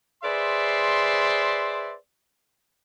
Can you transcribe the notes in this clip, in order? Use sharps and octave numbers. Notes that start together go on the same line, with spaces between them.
G#4 B4 C5 D5 E5 C6